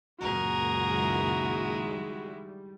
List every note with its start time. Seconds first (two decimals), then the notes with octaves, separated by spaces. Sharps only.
0.21 C#2 F#2 A#2 F#4 G#4 A#4
0.90 D#3 G#3 E4
1.84 G3